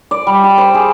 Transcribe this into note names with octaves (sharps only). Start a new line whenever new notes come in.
D5
G3
G4
C5
G#4